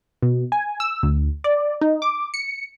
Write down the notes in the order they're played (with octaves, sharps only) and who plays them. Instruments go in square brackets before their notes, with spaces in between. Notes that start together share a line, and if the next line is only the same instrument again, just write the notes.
[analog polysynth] B2
G#5
E6
D2
D5
D#4
D6
C#7